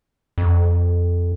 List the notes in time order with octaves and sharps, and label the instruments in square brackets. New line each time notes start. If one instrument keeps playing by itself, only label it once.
[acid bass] F2